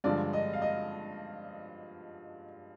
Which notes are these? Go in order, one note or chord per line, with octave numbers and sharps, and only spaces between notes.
G2 D3 F3 G#3 D5
D#5
F5
D#5